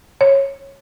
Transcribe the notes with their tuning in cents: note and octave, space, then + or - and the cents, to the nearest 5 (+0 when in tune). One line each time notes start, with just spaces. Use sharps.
C#5 -15